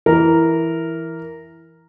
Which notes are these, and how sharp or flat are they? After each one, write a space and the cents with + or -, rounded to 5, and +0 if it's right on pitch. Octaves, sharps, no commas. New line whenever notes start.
E3 +0 A#4 +0